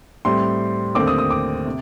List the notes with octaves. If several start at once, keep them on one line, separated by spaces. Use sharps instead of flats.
A2 G3 C4 C6
D#2 D3 A3 C4 D6
D#6
D#6
D6
C3